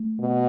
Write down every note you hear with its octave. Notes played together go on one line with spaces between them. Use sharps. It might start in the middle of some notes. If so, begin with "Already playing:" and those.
Already playing: A3
B2